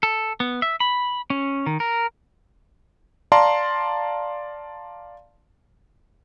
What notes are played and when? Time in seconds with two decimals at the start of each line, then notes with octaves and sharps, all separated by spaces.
0.03 A4
0.40 B3
0.62 E5
0.80 B5
1.30 C#4
1.66 D#3
1.80 A#4
3.32 D5 F5 A5 A#5 C6